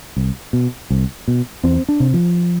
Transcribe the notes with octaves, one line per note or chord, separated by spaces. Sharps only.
C2
B2
C2
B2
E2 C4
D4
C3
F3